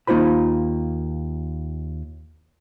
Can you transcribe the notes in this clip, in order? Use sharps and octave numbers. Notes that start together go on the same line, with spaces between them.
D#2 A#3 D#4 F4 C5 B5